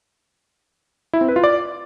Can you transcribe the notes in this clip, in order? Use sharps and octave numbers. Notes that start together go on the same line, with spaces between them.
E4
C4
B4
F4
D5